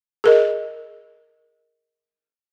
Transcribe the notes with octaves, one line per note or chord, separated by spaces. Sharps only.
G#4 A#4 D#5